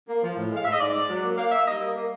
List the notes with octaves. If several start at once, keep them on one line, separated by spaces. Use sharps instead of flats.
A#3
F3
A2
G#3 F5
G#2 E5
D#5
G#2 D5
G#2
F#3
A#3
A#3 F5
A#3 E5
G3 D#5
A#3
A#3